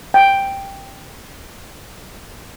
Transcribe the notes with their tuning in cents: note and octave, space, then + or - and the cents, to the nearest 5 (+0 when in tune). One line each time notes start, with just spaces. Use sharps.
G5 +5